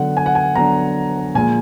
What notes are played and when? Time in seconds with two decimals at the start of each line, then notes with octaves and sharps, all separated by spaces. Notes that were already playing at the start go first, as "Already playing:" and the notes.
Already playing: D3 F#3 B3 D4 F#5
0.17 G#5
0.26 F#5
0.35 G#5
0.56 D3 F#3 B3 D4 A#5
1.35 A#2 F3 G#3 G#5